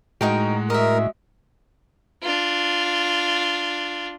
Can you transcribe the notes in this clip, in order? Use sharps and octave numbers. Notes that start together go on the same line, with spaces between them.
A2 G#3 D#4 F#4 A#4 G5
A#4 D#5 E5
D4 F4